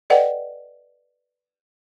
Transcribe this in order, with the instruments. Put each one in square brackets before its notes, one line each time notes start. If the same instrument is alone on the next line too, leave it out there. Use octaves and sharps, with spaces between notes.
[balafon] A4 B4 D5 D#5 F#5 G5